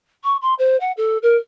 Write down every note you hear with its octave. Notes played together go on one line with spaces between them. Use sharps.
C#6
C6
C5
F#5
A4
A#4